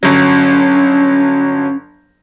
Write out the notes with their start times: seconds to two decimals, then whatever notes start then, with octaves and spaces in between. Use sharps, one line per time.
0.03 G1 F#3 C#4